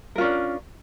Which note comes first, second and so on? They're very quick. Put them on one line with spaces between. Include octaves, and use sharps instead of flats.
A#4 F4 C#4 D4